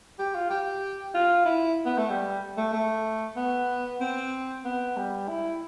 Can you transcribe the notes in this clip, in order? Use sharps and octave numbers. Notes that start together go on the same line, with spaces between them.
G4
F4
G4
F4
E4
B3
A3
G3
A3
A3
B3
C4
B3
G3
E4